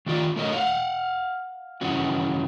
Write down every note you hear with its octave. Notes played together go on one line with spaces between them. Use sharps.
D#3 A3 F4 D5
A3 F#4 A#4 C#5 D#5
F5 F#5
G2 C#3 E3 C#4 F#4